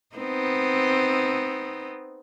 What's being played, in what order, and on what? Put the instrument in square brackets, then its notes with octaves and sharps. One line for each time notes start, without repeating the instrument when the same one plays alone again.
[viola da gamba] B3 C4 D#4